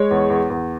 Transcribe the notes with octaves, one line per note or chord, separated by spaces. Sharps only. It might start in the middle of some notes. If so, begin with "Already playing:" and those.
Already playing: G#3 C#5
E2
E2
E2